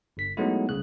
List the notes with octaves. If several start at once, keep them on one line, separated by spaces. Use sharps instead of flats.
G1 B6
F#3 G#3 A3 B3 D#4 E4
C2 C#3 F#6